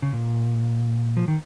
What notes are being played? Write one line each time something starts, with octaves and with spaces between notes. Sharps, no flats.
C#3
A#2
F3
D#3